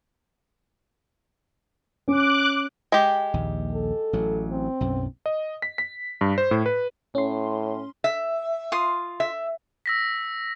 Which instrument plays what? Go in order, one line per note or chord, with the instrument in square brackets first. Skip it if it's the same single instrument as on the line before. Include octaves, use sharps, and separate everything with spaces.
[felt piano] C#4 [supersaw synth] D6 F#6
[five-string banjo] G#3 G4
[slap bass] A#1 D#2
[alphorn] A4
[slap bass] A1 F#3
[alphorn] C4
[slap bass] B1 F#2
[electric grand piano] D#5
B6
B6
G2
C5
A2
B4
[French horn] A2 [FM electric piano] C#4 C6
[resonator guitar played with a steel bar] E5
[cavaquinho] F4 C6 D#6
[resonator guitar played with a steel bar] E5
[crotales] E6 A#6 B6